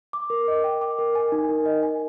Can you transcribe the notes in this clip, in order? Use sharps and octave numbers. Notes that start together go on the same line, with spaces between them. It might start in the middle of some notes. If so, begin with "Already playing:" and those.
D6
A#4
D#5
G5
D6
A#4
G#5
D#4
A#4
D#5
G#5